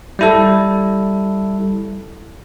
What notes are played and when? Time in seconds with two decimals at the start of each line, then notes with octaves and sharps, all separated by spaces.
0.19 G3 E4 A4